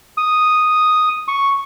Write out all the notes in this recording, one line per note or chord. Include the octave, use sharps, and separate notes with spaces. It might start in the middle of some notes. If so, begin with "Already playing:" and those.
D#6
C#6